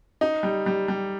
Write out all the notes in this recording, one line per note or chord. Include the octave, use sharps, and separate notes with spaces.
D#4
G3
G3
G3